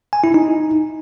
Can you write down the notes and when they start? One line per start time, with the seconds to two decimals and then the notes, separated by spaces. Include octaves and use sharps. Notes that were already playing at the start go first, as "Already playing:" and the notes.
0.13 G#5
0.24 E4
0.34 D#4